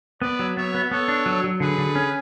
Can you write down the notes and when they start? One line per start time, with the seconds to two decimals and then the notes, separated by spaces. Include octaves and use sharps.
0.22 B3 B4 D5
0.39 F#3
0.57 B3 C#5 E5
0.74 B3
0.91 B3 A4 C#5
1.08 D4
1.26 F#3
1.44 F#3
1.60 D3 G#4 B4
1.78 D3
1.95 C#4